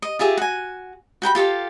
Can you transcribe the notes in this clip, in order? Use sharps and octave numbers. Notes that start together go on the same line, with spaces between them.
D#5
F4 G4 G#4 E5
F#4 G#5
F#4 G5 A#5 B5
F4 G4 A4 F5